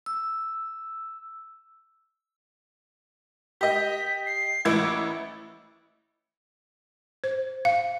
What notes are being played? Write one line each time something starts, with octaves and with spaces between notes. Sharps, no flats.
E6
G4 D#5 B6
C7
A1 E4 D6 G#6
C5
F5